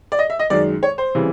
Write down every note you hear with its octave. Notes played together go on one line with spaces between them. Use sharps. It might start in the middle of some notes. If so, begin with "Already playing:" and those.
D5
D#5
E5
D#5
F#2 D#3 G#3 D5
C#5
C5
C#3 E3 G3 C4